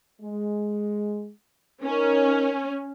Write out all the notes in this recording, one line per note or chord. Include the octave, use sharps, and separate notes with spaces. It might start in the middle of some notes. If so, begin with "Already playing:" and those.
G#3
C#4 D#4 A#4